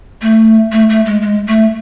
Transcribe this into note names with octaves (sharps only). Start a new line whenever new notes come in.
A3
A3
A3
G#3
G#3
A3